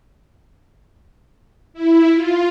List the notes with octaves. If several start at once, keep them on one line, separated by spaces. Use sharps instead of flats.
E4
F4